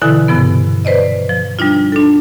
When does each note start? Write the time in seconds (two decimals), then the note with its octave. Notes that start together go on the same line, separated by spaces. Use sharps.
0.01 B2 D3 E3 E4 A4 G#5
0.28 G2 C3 F3 B3
0.85 B4 C5 D5 D#5
1.29 F3
1.59 G3 D4 D#4 F4
1.92 D4 A4